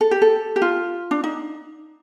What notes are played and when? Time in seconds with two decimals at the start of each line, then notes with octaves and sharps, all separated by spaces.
0.01 A4
0.11 G4
0.22 A4
0.56 G4
0.62 F4
1.11 D4
1.24 D#4